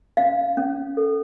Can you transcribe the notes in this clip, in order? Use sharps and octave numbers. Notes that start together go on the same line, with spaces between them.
C#4 F5
C#4
A4